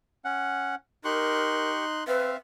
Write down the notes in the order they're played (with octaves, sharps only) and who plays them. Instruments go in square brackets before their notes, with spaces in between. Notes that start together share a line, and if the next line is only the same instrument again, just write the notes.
[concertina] C#4 F#5
[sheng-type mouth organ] D#4 C6 F#6 [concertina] G4 C#6 [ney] A#4
[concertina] C4 F5 [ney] B4 [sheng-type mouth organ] E5